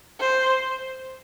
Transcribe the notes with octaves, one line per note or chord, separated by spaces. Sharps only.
C5